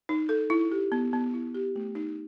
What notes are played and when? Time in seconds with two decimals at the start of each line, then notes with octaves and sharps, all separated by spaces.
0.09 D#4
0.29 A4
0.50 E4
0.72 G4
0.92 B3
1.13 B3
1.33 E4
1.54 G4
1.76 A3
1.95 D#4